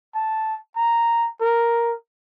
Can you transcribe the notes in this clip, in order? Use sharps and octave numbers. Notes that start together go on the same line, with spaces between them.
A5
A#5
A#4